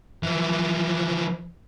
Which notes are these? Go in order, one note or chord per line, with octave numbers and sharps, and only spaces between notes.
E3 F3